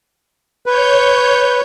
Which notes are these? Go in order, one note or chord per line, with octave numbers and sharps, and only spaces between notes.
B4 C#5 G6